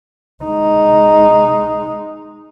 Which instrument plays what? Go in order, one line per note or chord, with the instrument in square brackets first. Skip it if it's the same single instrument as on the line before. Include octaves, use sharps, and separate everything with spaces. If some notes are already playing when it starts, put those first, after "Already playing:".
[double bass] G#3 D#4